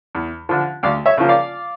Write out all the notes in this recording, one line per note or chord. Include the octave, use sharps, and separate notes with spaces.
E2
D3 F3
D2 D5 F5
C#5 E5
C#3 F3 A#3
D5 F5